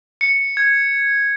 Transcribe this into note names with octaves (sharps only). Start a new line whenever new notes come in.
C#7
G#6